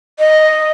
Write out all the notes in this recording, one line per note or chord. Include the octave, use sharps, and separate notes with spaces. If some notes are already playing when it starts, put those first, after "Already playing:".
D#5